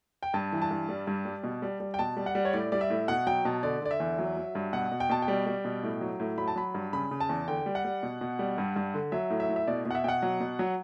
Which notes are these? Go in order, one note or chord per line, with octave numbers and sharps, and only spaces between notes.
G5
G2 A5
E3
A5
G2
G3
G2
G3
B2
G3
G3
G5
B2 A5
G3
F#5
G3
C#5
A2 D5
G3 D5
E5
A2
B2 F#5
F#3 G5
B2 A5
D3 D5
D3 D5
E5
E2
F#3
F#3
G2
B2 F#5
B2
G5
B2 A5
G5
G3
G3
B2
A2
F#3
A2
F#3 B5
A5
F#3 B5
G2
C#3 B5
C#3
A5
E2
D3 G5
G3
F#5
G3
B2
B2
G3
G2
G2
D3
F#3 E5
A2
E5
A2
E5
B2 D5
B2
F#5
E5
B2 F#5 G5
F#3
B2
F#3